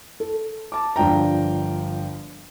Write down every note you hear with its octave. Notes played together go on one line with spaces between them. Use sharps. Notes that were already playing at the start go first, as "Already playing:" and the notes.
A4
A5 D6
G1 F3 D4 G5 A#5